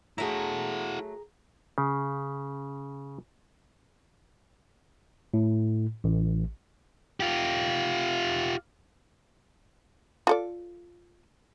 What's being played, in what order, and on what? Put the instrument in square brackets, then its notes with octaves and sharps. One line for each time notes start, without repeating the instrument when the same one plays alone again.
[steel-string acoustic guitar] F#3 A3 [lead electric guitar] E4 F#4 [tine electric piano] G#4 A#5
[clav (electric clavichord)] C#3
[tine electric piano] A2
A1
[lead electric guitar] F4 G4
[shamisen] F4 A4 D5